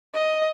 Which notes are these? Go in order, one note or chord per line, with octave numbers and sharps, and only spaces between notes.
D#5